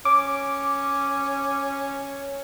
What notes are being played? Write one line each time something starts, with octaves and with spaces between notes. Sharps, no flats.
C#4 D6